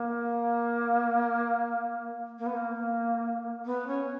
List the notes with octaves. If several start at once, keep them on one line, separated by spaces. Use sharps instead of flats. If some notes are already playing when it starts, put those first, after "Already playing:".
Already playing: A#3
A#3
B3
A#3
B3
C#4